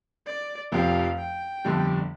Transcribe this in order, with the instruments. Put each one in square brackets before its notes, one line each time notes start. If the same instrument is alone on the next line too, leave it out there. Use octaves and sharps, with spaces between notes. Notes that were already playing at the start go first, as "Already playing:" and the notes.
[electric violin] D5
[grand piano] F1 F2 F3 C4 G4 [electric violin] F5
[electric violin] G5
[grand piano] G1 F2 D3 G3 D4